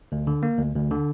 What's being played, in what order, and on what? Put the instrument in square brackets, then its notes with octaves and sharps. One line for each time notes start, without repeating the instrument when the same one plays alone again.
[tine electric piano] D2
D3
A#3
D2
D2
D3